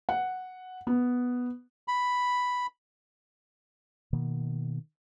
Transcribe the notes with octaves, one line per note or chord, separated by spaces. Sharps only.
F#5
B3
B5
B2 D#3 A#3